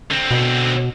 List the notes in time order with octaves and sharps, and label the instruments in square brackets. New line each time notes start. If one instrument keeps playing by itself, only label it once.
[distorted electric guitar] D3 C4
[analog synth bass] B2